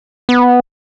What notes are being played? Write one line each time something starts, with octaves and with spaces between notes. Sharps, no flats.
B3